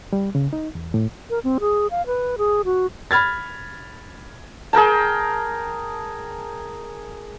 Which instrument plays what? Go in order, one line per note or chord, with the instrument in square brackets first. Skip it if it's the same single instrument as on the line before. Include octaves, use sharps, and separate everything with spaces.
[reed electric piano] G3
C#3
D#4
E2
A2
[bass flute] A#4
C4
G#4
F5
B4
G#4
F#4
[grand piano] B5 F6 G#6 A6
[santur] G#4 A#4 G5 A5